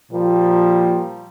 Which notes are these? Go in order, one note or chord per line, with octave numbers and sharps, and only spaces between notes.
A#2 F3 G3 A#3